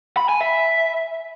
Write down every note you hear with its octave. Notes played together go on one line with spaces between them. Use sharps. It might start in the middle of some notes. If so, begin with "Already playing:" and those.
B5
G#5
E5